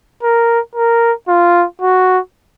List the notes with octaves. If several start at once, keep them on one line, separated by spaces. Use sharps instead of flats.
A#4
A#4
F4
F#4